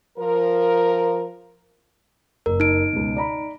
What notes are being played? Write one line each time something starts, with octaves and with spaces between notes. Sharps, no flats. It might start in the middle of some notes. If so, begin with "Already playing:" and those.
F3 A#4
F#1 A#4
D#4 D7
C#2 B2
D5 A#5 B5